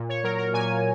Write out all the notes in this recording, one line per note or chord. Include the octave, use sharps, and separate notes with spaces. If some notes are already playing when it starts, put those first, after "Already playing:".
Already playing: A#2
C#5
F#3 A#4
A#4
A#2 G#5